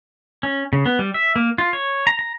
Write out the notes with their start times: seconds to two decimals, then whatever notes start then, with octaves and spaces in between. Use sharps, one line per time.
0.43 C#4
0.73 C#3
0.86 B3
0.99 G3
1.14 E5
1.36 A#3
1.58 F4
1.73 C#5
2.07 A#5
2.19 A#5